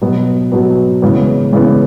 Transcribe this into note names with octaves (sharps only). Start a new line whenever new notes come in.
B2 F#3 B3
B2 F#3 B3
C#3 E3 G#3 B3
C#3 E3 G#3 B3